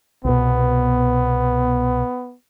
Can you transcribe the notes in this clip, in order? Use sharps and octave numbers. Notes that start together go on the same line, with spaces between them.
C2 B2 B3